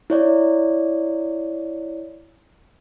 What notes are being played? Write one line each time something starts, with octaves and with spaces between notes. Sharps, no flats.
E4 C#5 D5